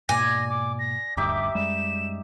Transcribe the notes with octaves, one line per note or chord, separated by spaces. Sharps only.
G#2 B2 A#3 D5 G#5 A#6
D6
A#6
D#1 D2 G2 D#4 G4 E5 D6
F#2 G3 G#3 E7